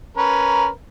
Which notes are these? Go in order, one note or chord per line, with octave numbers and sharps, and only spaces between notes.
C#4 A#4 B4